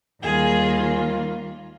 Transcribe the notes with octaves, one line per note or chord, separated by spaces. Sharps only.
D#2 D#3 G3 A#3 F4 G#4